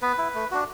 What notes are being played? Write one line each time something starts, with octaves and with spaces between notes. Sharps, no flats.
B3 B4
E4
A3
D4 F#4